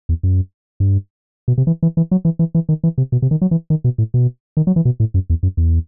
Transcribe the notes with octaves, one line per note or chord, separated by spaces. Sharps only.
E2
F#2
G2
B2
C3
E3
E3
E3
F#3
E3
E3
E3
D#3
E3
C3
B2
C3
D#3
F#3
E3
D#3
B2
A2
B2
D#3
F#3
E3
B2
A2
F#2
E2
F#2
E2